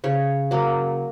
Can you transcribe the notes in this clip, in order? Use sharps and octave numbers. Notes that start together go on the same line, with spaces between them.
C#3 C#5
F#3 A#3